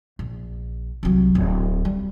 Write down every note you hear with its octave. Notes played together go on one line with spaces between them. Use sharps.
A#1
C2 F#3
D1
G3